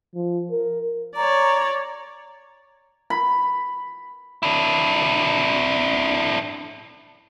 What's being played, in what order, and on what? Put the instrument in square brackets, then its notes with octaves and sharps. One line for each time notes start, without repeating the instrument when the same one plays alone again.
[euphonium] F3
A#4
[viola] C#5 D5 [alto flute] A#5
[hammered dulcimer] B5
[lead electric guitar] D4 E4